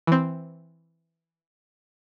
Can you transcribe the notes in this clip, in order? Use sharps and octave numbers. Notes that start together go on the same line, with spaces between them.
E3 C4